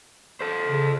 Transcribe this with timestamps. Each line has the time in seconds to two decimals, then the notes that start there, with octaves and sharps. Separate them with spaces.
0.41 A4 C5
0.67 C#3